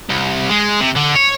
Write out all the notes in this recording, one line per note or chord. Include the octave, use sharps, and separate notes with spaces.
C2
G#3
C3
D3
C#5